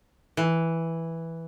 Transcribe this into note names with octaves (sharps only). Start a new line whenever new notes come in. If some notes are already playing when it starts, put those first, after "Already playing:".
E3